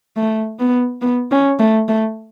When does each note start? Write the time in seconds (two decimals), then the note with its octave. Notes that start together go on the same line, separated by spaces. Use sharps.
0.17 A3
0.60 B3
1.01 B3
1.31 C#4
1.59 A3
1.89 A3